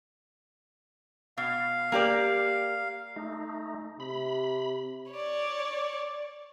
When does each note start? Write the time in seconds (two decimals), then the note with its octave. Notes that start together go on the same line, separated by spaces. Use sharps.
1.38 B2 F5
1.92 A#3 G4 D5
3.16 A3 D#4
4.00 C3 B5
5.12 C#5 D5